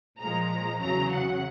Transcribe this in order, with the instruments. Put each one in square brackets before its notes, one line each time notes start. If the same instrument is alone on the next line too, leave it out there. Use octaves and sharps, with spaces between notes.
[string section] A#2 F3 G#3 A#5
E2 C#3 F#3 A#5
F#5